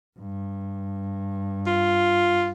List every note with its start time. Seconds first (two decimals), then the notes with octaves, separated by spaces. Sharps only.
0.19 G2
1.66 F4